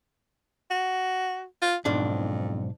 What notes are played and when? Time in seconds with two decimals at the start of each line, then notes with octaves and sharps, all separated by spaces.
0.71 F#4
1.62 F4
1.85 B1 F2 G#2 D4